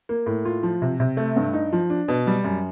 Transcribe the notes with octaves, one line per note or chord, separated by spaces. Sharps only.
A#3
A2
F4
F3
C3
C3
A3
G2
D#4
F3
D4
B2
G3
F#2